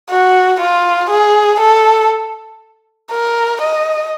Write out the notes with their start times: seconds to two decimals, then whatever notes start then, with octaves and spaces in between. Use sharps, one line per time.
0.10 F#4
0.60 F4
1.10 G#4
1.60 A4
3.11 A#4
3.62 D#5